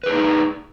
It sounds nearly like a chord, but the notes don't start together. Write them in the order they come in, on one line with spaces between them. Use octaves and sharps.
B4 G#4 D4 D#4